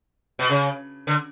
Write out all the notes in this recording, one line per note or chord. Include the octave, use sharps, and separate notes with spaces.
B2
C#3
D3